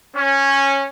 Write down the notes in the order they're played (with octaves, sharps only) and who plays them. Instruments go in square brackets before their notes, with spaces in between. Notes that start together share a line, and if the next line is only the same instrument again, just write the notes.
[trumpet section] C#4